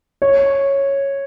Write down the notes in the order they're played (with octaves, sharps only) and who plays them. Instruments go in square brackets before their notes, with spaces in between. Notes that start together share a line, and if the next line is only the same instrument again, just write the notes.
[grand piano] C#5